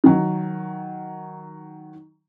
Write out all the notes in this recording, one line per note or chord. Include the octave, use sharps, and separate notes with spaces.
D#3 F#3